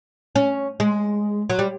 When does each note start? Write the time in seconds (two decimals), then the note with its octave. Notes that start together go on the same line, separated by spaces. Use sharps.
0.36 C#4
0.80 G#3
1.50 F#3
1.59 G3